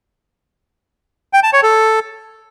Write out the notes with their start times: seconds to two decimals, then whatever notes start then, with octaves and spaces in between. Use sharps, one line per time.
1.33 G5
1.43 A5
1.53 C#5
1.63 A4